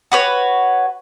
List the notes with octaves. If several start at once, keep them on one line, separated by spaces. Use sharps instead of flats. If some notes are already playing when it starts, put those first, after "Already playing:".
F#4 B4 C#5